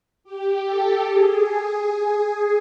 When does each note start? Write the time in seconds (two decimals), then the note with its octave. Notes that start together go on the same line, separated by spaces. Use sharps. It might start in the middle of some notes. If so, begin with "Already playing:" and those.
0.24 G4
0.66 A4
1.08 G#4